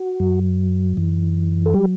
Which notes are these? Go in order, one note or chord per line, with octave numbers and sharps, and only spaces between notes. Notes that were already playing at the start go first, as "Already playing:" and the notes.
Already playing: F#4
F#2 F#3
F#2 E3
A4
F#3 G3 G4